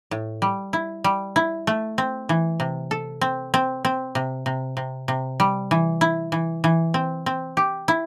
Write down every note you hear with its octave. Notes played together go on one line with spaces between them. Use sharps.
A2
G3
E4
G3
E4
A3
C4
E3
C3
A4
C4
C4
C4
C3
C3
C3
C3
G3
E3
E4
E3
E3
C4
C4
G4
E4